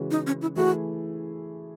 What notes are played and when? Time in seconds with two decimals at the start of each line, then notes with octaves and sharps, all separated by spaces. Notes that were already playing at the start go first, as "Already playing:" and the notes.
Already playing: C#3 E3 G#3 C#4 F#4
0.11 D#4
0.27 C#4
0.42 E4
0.56 E3 A3 E4 F#4 G#4